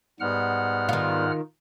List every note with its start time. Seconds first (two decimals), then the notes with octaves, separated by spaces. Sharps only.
0.20 G#2 G3 B3 F#5 F6
0.89 D#3 F4